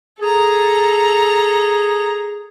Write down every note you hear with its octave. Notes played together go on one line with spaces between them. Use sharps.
G#4 A4 A#5